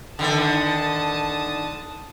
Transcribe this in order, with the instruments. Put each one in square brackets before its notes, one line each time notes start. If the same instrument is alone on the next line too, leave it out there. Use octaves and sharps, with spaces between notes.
[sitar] D3 D#3 A4 [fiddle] A5 D#6